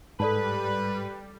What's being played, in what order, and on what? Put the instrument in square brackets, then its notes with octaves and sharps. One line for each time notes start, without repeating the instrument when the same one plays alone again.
[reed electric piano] G#2 [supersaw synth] G3 [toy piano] A4 D5 A5 [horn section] B4